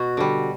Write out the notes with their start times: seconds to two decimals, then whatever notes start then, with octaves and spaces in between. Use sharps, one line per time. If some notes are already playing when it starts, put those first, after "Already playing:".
Already playing: B2 F#4
0.17 D3 G3